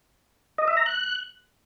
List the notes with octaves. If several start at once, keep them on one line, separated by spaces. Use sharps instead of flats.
D#5
E5
A#5
F#6